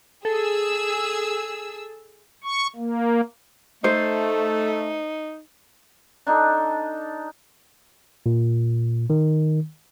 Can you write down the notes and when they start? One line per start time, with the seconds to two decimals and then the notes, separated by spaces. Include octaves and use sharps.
0.25 G#4 A4 E6
2.44 C#6
2.76 A#3
3.84 A3 D#4 C5
6.27 D4 D#4 A4
8.26 A#2
9.10 D#3